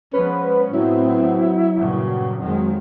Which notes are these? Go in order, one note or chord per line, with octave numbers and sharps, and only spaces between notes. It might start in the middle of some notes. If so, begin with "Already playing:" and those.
F3 G#3 B3 C#4 B4
A2 F#3 B3 C4 E4
G2 A#2 C#3
F2 D#3 G#3